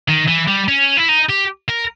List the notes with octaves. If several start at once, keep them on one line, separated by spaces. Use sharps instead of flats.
D#3
E3
G3
C#4
E4
D#4
G4
A#4